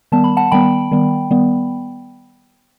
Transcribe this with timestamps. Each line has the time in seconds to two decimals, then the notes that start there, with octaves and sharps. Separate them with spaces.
0.12 D#3 G3 B3 A5
0.24 B5
0.37 F#5 A5
0.52 D#3 G3 B3 G5 B5
0.91 D#3 G3 B3
1.31 D#3 G3 B3